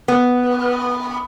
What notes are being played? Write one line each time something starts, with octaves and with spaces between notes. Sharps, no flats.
B3